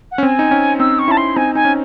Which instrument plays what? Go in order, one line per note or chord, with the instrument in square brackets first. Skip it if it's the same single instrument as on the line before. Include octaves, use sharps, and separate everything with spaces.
[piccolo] F#5
[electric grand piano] C#4
[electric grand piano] C4 [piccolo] G#5
[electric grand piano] D#4
C#4
[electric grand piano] C4 D#4 [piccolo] E6
[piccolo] C#6
[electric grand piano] C#4 E4 [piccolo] A5
[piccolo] C6
[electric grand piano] C4 D#4 [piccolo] G#5
[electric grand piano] D#4 [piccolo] G#5
[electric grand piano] C#4